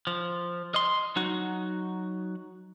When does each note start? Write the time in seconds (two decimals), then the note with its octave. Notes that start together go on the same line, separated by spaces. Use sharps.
0.07 F3
0.74 D#5 C6
1.16 F#3 D#4 F#4